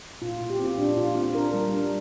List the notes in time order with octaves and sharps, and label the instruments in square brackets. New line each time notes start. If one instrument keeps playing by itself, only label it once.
[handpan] A#2 F4
A#2
G4
C4 F4
A#2 D4
A#2 F4
C4 F4
D4 A#4
G3
D4